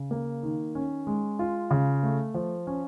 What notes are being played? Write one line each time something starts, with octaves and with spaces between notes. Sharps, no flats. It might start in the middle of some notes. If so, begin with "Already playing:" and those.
Already playing: C#3
A#3
D#3
C#4
G#3
F4
C#3
A3
F3
C#4